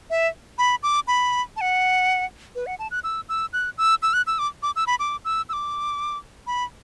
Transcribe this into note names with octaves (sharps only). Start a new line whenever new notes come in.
E5
B5
D6
B5
A5
F#5
B4
F#5
A5
F#6
E6
E6
F#6
E6
E6
F#6
E6
D6
D6
E6
B5
D6
E6
E6
D6
B5